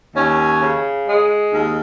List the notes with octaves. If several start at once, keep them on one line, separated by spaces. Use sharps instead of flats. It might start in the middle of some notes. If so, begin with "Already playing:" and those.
D#2 C#4
C#3
G#3
D#2